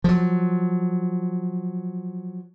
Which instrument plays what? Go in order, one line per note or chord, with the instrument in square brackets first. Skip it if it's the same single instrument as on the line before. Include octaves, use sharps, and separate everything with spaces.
[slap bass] F3 F#3